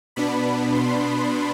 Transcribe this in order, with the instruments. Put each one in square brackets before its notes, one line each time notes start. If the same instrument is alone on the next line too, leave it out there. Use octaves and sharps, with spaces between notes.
[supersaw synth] B2 B3 D4 B5
C6